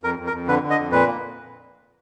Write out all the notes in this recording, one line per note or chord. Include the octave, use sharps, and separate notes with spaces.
F2 A#4
F2
A#4
F2
D3 B4
D3
D#5
F2
A#2 B4
A#3